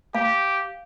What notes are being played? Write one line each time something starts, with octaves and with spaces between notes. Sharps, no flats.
G4 F5